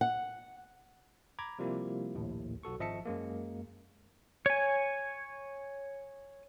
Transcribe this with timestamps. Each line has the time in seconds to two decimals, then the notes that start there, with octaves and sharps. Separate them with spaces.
0.01 F#5
1.39 A#5 B5 D6 G#6
1.59 C3 F3 G3 A#3 E4 F4
2.15 A#1 D#2 A2
2.63 B1 F#4 A4 C#6
2.79 G#1 F3 D#5 E5 A5 C#7
3.05 F#2 G#3 A#3
4.46 C#5 G#5